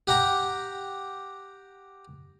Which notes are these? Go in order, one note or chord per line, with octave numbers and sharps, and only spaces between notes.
G4 F#5 G5 A#5